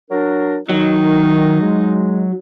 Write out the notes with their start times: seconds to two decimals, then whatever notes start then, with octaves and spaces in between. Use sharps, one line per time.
0.11 F#3 D4 A#4
0.69 D#3 F#3 D#4
1.61 G#3